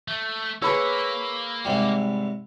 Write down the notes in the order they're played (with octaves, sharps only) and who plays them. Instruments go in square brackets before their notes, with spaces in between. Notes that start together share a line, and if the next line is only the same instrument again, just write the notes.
[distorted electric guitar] A3
[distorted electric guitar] A#3 [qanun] G#4 B4 C#5 [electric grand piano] B5 E6
[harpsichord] G#2 C3 G3